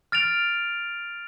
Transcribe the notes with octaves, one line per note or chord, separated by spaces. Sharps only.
F6 A6 D7 F7